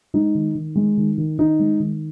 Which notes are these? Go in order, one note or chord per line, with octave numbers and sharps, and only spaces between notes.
G#3 D#4
D#3
D#3
G#3
D#3
D#3
D#3 D#4
G#3
D#3